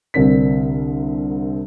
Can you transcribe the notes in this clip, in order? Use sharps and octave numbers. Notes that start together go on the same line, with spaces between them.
C2 D3 C4 D4 A#4 B6